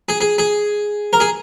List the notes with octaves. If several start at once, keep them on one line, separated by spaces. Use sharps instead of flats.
G#4
G#4
G#4
A#4
G#4